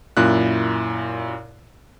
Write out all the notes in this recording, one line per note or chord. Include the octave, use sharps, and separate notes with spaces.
F#2 A#2 E4 F#6